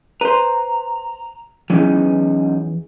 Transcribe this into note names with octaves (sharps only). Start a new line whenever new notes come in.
B4 C5 A#5
E2 E3 F#3 C#4 D#4